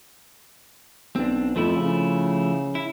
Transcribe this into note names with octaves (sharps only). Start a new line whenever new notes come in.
B1 C4 D4
F2 F3 A3 E4
C#3
E4